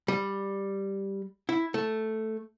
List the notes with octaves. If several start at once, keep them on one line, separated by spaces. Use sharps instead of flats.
G3
E4
A3